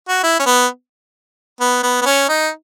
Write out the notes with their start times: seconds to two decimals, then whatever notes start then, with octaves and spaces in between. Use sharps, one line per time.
0.08 F#4
0.23 E4
0.39 C#4
0.46 B3
1.60 B3
1.83 B3
2.01 B3
2.05 C#4
2.29 D#4